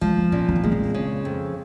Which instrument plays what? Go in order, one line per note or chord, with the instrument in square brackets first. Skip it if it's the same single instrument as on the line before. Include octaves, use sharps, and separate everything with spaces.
[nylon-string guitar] F3 [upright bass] G#3
[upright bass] A#3
[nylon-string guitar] A#2 [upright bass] C#4
[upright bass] C#4
C4
[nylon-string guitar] G#3 [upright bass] A#3
[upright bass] C4
[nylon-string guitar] C#3
F2